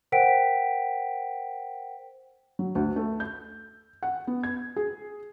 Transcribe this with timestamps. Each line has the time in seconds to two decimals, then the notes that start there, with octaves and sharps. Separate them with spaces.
0.12 A#4 C5 F#5 G5 B6 D7
2.59 F#3
2.75 D2
2.96 A3
3.20 G6
4.03 F#5
4.27 B3
4.43 G#6
4.76 G#4